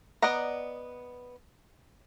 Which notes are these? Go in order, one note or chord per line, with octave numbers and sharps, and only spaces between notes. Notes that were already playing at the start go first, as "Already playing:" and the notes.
B3 D5 D#5 F#5 A#5